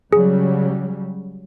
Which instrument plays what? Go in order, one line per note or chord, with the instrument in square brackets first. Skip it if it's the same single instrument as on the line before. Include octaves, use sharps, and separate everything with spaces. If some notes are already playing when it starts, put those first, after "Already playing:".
[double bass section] C#3 F#3 G3 [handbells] G#4